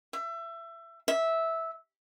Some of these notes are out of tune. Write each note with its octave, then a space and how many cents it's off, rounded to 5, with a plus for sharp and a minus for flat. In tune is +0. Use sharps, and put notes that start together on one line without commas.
E5 +25
E5 -10